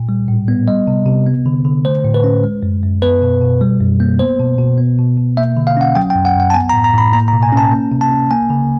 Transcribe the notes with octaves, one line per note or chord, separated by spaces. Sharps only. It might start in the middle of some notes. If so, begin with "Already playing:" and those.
Already playing: A#2
G3
A2
B3
G3 D#5
C3
C3
B3
D3
D3
A3 C5
A2
B4
C#4
G#3
F#2
F#2
B3 B4
B2
B2
G3
F#2
A#3
B3 C5
B2
B2
B3
B2
B2
A#3 E5
D3
F5
C#4 F#5
F#3 G5
G5
F#2
F#5
F#2 F#5
A5
B3 G#5
A#5
A2
A#5
A2 B5
A#3 A#5
A#5
B2
G#5
C#4 A5
A#3
C3
A5
C#4
A#3 G#5
C#3